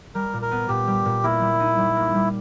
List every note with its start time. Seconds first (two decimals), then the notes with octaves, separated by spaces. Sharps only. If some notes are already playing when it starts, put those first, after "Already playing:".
0.15 G3 A#4
0.33 A#2
0.42 A#4
0.51 B3
0.69 A#2 G4
0.87 G3
1.05 A#2
1.24 A#3 E4
1.41 G3
1.60 D#4
1.78 G3
1.96 A#3
2.14 G3